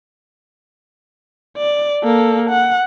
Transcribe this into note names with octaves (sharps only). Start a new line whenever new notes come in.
D5
A#3 A4
F#5